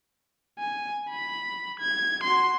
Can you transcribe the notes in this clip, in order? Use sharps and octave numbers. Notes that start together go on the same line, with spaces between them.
G#5
B5
G#6
F#4 C6